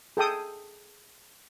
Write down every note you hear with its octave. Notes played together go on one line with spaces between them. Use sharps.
G#4 A4 G5 D#6